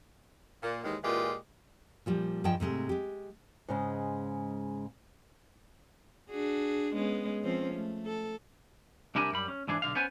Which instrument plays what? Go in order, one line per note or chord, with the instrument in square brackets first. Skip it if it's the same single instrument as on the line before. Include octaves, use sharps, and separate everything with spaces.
[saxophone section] A#2
D#2 D#3 E3 G#3
A#2 E3 G#3 F4 G4
[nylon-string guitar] A#2 F3 G3
G2 F3 G#4 D#5 G5 A5
G#2 C3 G#3 A3
G#3 G4
G#2 C#3 G#3
[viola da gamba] D4 F#4 G#4
G#3 B3 C#4
F3 C4 C#4
A3
A4
[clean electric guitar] C2 D4 E4 G4 A#4 G#5
F#2 G3 B5
C#4
G#2 E3 D4 G#4
B1 D3 F5
B3 C#4 C5 G#5